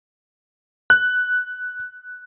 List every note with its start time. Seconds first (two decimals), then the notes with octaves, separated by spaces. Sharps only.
0.90 F#6